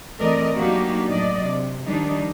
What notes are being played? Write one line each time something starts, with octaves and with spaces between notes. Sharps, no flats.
E3 A3 C4 A#4 D5 D#5
F#3 A#3 D4 D#4 F#4 G4
A2 F#3 D4 D5 D#5
C3
D#3 F3 G3 D4 D#4